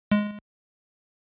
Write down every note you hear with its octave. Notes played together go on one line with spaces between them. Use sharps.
G#3